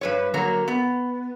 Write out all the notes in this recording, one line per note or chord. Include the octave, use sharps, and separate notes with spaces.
G2 B4 C#5
D3 F#3 A#3 A#4 C#5
B3